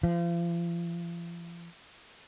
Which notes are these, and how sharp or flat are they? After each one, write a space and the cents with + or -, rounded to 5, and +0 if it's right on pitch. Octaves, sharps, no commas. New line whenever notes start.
F3 -40